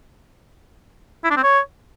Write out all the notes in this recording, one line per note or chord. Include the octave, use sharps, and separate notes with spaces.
E4
D4
C4
C#5